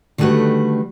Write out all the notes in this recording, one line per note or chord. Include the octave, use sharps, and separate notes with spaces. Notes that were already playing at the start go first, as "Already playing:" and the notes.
D3 D#3 G3 A3 F#4 B4